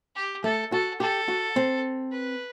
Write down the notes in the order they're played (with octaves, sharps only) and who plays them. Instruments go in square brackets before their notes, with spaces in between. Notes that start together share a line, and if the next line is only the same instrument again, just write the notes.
[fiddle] G4
[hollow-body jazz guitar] A3 [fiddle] A4
[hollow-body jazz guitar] F#4 [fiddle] A4
[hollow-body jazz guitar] G4 [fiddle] A4
[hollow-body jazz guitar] F#4
C4
[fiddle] B4